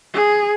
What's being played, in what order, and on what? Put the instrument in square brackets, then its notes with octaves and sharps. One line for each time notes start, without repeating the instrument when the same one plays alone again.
[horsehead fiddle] G#4